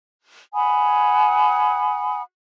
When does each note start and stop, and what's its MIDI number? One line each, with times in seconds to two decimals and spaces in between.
0.54 2.21 78
0.54 2.21 80
0.54 2.21 83
0.54 2.21 87